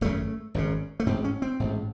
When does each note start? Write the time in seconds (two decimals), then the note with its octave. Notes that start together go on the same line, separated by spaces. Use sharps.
0.01 G#1 F#2 C#3 A3
0.54 G#1 F#2 C#3
1.00 A3
1.06 A1 G#2 C4
1.24 C#4
1.42 C4
1.60 A1 G#2